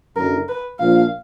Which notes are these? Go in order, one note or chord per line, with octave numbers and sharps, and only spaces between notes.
F#1 F#2 D3 A#4
B4
A#1 A#2 F3 F5